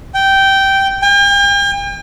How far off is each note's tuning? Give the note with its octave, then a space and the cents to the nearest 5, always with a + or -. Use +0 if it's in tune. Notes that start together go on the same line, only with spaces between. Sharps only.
G5 -10
G5 +45